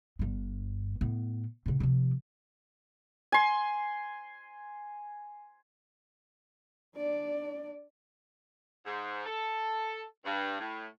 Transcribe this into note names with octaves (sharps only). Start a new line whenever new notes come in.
G1 G2
A2 B3
A2 C#3
C3 F3
G#5 C6
D4 D5
G#2
A4
G2
A2